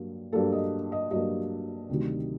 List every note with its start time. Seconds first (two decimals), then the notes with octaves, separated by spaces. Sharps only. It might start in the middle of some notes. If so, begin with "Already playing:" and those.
Already playing: G2 F#3 A#3
0.33 G2 F#3 A#3 A4
0.52 D#5
0.92 D#5
1.11 G2 F#3 A#3 D#5
1.89 D2 C3 D#3 F#3